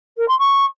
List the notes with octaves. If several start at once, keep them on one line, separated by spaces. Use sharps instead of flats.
A#4
C6
C#6